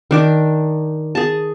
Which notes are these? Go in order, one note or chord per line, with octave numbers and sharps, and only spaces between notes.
D#3 D4 D6
G#4 A5